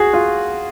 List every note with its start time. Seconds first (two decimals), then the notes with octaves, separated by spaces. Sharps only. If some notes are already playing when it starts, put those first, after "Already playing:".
Already playing: F#4 G#4
0.14 F4